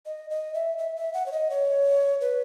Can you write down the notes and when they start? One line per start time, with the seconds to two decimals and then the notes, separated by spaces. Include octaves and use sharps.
0.06 D#5
0.30 D#5
0.54 E5
0.78 E5
0.96 E5
1.14 F#5
1.26 C#5
1.32 D#5
1.50 C#5
2.21 B4